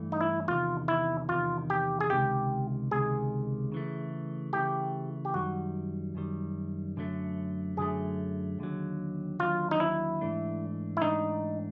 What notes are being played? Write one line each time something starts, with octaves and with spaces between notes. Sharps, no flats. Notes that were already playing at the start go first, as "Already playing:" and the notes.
Already playing: G2 E3 A3
D#4
E4
E2 C3 D#3 F4
E4
E2 C3 D#3 F4
G4
G#4
C#2 C3 D#3 G4
C#2 C3 D#3 G#4
C#3 E3 A3
C#3 E3 A3 G4
G4
F#2 D#3 G3 F#4
F#2 D#3 G3
F#2 D3 F#3 A3
F#2 D3 F#3 A3 G#4
D#2 D3 F#3
D#2 D3 F#3 F4
D#4
E4
G#2 E3 A3 D4
E4
G#2 E3 A3 D4 D#4